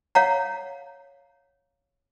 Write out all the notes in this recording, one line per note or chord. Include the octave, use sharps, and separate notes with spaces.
C#5 F5 F#5 A#5